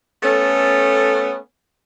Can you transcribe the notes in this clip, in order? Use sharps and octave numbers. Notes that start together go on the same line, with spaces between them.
A3 B3 C#4 A4